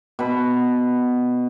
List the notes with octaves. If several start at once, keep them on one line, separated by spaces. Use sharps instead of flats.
B2 B5